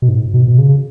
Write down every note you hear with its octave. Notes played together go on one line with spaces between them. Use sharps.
B2
G#2
B2
B2
C#3